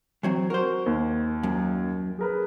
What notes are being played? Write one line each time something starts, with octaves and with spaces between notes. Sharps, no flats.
E3 F#3 C4
F#4 A#4 C5
D#2
F#2
G#4 A#4 B4